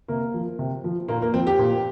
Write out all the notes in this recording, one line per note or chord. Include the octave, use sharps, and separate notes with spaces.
C3 A#3
F3
C3
F3
A#2 A#3
A#3
F3 C4
G4
A#2